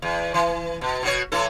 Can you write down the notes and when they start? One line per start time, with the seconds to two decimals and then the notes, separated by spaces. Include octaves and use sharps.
0.02 E2
0.34 E3
0.81 B2
1.03 B2 F#4 C#5
1.32 A2 E3 A4